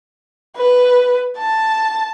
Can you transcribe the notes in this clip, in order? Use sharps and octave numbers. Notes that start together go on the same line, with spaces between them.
B4
A5